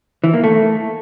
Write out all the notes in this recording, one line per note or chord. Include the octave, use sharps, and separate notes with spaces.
E3
A#3
A3